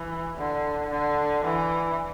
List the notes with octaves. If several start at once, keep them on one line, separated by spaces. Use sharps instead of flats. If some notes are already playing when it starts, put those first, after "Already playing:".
Already playing: E3
D3
D3
E3